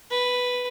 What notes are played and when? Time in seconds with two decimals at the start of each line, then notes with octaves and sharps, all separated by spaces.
0.10 B4